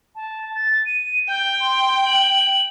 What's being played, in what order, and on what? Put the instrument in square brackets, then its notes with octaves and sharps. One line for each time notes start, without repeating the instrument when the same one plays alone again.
[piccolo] A5
A6
D#7
[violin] G5 [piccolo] G6
[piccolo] C6
F#7